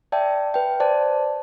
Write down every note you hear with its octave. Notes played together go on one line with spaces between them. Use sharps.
D5 E5 G5 A5
B4 G5
C5 D5 A5